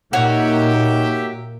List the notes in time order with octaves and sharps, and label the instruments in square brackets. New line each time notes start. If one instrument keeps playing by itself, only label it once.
[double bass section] A#2 A#3 [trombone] D#4 [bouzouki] F#4 C#5 [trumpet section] G4 E5